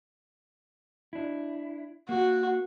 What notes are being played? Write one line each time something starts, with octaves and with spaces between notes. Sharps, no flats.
D4 E4
A#3 F#4